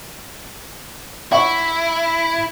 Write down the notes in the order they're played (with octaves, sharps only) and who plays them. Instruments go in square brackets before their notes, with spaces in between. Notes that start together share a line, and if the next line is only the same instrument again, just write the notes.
[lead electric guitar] E4 [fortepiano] E5 F#5 C#6